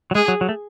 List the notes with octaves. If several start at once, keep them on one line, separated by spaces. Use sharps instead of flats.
F#3
G#3 G#4
F#3
F#3
A3